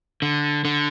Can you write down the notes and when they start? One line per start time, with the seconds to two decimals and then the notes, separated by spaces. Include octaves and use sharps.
0.22 D3
0.65 D3